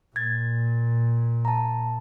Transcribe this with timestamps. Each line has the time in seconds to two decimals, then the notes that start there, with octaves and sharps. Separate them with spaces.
0.16 A#2 G#6 A6
1.45 A5 A#5